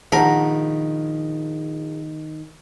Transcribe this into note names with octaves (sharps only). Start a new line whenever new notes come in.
A#1 D#3 A#4 F#5 A5 B5